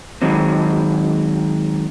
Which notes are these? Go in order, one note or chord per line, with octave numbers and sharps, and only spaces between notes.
D#3 F#3 G#3 C4